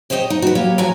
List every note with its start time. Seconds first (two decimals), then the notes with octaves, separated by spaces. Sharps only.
0.10 G4 C5 C#5 D#5 G5
0.30 D#4
0.42 F#4 B4
0.55 F#3 A#3 G4 C#5
0.78 D#2 F3 F#4 C#5 G#5 A#5